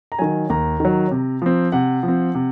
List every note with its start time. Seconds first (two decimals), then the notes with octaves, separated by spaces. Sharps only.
0.12 A#5
0.19 D#3 F#3 G#5
0.50 D#2 A#5
0.80 D#3 F#3
1.11 C3
1.42 F3 C4
1.72 C3 F#5
2.03 F3
2.08 C4
2.35 C3